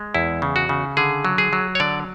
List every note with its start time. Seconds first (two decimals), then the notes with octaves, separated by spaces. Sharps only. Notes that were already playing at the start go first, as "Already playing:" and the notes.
Already playing: G#3
0.15 E2 E4
0.42 C#3
0.56 F#4
0.69 C#3
0.97 D3 G#4
1.25 F#3
1.38 G#4
1.53 F#3
1.75 C#5
1.80 D3 D5